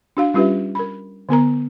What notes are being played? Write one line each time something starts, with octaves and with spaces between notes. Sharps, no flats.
D4 F#4 F5
G3 C#4 F4 G4 B4 E5
A#4 B5
D3 B3 A#4 A#5